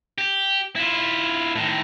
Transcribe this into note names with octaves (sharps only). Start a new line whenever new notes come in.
G4
E4 F4
A2 D#3